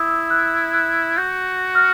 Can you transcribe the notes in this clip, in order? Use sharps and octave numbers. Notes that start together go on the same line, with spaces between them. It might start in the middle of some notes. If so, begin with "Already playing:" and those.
Already playing: E4 D#6 E6
F#6
F#6
F#4 G6
F6